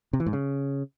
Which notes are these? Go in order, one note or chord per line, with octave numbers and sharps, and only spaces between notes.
C3
E3
G#2
C#3